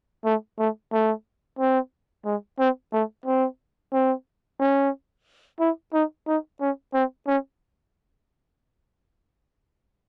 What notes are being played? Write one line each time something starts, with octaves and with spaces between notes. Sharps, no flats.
A3
A3
A3
C4
G#3
C4
A3
C4
C4
C#4
E4
D#4
D#4
C#4
C4
C#4